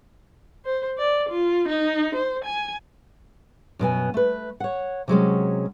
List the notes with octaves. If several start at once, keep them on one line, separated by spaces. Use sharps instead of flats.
C5
D5
F4
D#4
C5
G#5
F#2 B2 B3 G#5
A3 B4
C#5 F#5
C3 F#3 G#3 C#4